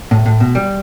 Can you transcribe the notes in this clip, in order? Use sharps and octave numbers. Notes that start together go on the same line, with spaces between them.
A2
A2
B2
G3